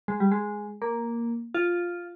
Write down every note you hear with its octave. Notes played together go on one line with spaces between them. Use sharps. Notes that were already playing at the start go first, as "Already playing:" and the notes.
G#3
G3
G#3
A#3
F4